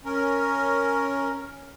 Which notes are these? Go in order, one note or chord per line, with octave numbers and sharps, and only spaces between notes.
C#4 A#4